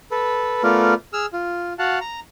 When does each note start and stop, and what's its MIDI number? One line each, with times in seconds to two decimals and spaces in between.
0.11 0.63 69
0.11 0.63 71
0.63 0.94 57
0.63 0.94 59
0.63 0.94 65
0.63 0.94 70
0.63 0.94 74
1.13 1.26 68
1.13 1.26 88
1.13 1.26 89
1.33 1.73 65
1.79 1.99 66
1.79 1.99 77
1.79 1.99 78
1.79 1.99 81
2.01 2.20 82